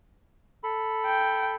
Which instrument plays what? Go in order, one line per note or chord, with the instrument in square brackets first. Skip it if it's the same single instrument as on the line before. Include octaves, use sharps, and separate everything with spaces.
[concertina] A4 B5
[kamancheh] G5